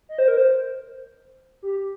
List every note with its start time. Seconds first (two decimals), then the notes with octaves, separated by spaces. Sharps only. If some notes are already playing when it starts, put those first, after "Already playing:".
0.09 D#5
0.18 C5
0.28 A#4
0.37 C5
1.63 G4